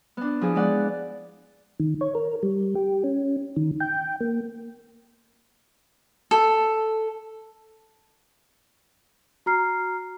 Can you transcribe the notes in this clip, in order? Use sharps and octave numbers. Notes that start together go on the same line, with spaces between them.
B3 D4
F3 E4 G#4
G#3 B3 D5 F#5
D#3
C#5
A#4
G3
G4
C#4
D#3
G5
A#3
A4
F#4 A#5 F6 C7